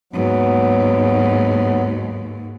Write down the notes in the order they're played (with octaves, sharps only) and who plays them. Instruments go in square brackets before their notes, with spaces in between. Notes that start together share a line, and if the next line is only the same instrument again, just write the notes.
[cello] D#2 G#2 [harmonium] F#3 B3